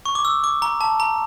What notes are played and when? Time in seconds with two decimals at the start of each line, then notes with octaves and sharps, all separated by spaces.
0.06 C#6
0.15 D6
0.25 E6
0.44 D6
0.62 A#5
0.81 A5
1.00 A#5